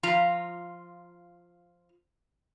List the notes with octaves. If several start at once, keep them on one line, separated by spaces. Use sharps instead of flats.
F3 F4 A#5